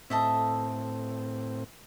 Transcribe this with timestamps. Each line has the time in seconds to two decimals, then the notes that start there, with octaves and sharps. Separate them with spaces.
0.10 A2 C4 A4 D#5 E5